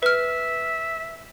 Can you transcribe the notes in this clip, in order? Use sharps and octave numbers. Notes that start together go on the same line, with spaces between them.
B4 E5 F6